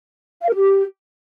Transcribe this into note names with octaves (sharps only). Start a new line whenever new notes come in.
F5
A#4
G4